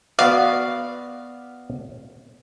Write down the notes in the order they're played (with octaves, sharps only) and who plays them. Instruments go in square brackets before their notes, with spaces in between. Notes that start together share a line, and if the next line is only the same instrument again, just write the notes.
[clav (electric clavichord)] B3 F#4 D5 [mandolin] F5